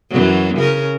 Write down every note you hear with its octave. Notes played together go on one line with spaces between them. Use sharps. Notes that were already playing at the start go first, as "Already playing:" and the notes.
F#2 E3 F#3
C#3 C#4 A#4